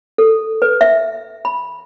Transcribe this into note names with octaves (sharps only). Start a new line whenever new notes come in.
A4
B4
E5
B5